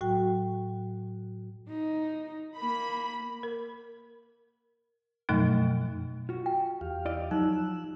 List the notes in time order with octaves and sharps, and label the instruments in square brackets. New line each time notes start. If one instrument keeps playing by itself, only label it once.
[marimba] A2 F#3 F#4 G5
[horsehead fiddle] D#4
[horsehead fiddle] A#3 [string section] B5
[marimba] A#4
F#2 B2 F3 F#3 A3 D#4
[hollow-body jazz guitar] F4 F#4
[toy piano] G5
[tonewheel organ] E2 G4 F5
[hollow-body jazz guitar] E4 D5 D#5
[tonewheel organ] F3 E6 F#6 [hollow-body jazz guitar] F#3 [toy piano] D#4